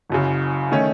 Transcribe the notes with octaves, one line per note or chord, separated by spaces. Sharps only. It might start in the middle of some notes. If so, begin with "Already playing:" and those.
F#1 F#2 C#3
D#3 A3 C#4